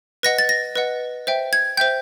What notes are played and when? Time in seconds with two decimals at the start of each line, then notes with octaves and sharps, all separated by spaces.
0.23 B4 D#5 F#5 A#6
0.38 A6
0.49 A#6
0.75 B4 D#5 F#5
1.27 C5 E5 G5
1.53 G#6
1.77 C5 E5 G5 G6